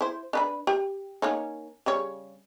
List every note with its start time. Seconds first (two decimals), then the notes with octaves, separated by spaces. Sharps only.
0.01 E4 C5
0.33 D4 B4 B5
0.67 G4
1.22 A#3 C#4 D#4
1.86 C#3 G3 C#5